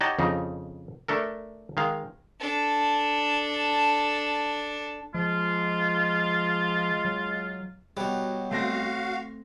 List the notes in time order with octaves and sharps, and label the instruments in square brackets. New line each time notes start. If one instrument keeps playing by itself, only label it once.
[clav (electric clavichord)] D#4 G4 C#5 D#5 F#5 A5
F2 C#3 D#4
A3 D4 A4 A#4
D#3 G#3 F5
[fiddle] D4 A4
[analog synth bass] F3 [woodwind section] G#3 F4
[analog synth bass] F#3
[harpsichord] B2 G3 [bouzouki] F#3
[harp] A3 C4 A#6 [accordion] F#4 F5